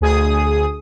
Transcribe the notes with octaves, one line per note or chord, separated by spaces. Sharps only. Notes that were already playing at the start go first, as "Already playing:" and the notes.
D2 G#4 D#6